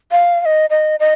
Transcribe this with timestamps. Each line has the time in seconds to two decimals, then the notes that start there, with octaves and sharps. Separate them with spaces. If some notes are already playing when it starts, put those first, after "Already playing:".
0.11 F5
0.41 F5
0.46 D#5
0.70 D#5
1.00 D#5